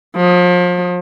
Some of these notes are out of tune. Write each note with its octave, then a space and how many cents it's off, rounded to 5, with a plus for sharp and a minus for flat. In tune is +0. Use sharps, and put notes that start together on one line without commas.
F3 +35